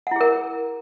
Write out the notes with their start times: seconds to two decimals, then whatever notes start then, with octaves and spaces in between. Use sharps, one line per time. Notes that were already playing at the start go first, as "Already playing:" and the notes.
0.07 F#5
0.11 E4
0.16 G#4
0.21 A#4